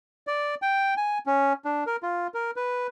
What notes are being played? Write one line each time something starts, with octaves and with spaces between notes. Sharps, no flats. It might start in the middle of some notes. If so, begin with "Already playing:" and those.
D5
G5
G#5
C#4
D4
A#4
F4
A#4
B4